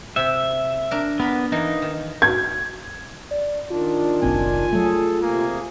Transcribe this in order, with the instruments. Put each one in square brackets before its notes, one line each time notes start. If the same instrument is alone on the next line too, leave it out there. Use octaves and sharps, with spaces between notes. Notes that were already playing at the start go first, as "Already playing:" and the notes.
[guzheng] C3 B5 [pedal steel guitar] E5
[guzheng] D4 A#4
[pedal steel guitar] B3 [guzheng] A#4 B5
[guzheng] E3 A#3 [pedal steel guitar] D#4
[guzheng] D#3
[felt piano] G#6
[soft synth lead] D5
[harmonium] D#3 D4 [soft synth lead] F4
[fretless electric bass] F#1 B1 C4 [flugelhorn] G#5
[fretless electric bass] F#3 A3 [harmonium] G#4 A4
[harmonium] C3 G#4 G#5 [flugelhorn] A#3